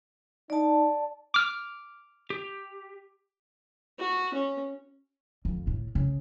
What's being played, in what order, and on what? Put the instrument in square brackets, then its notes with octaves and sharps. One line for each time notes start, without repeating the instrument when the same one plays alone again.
[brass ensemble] D#4 [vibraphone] D5 A5
[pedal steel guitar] D6 F6
G4
[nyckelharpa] F#4
C#4
[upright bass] F2
A2
C#3